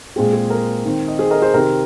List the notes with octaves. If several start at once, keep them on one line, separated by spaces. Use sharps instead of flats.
A#2 G#3 C4 G#4
G#4
A#4
D#3 C4
D#5
G#4 C5
A#4 D#5
G#4 C5
C3 D#3 C4 A#4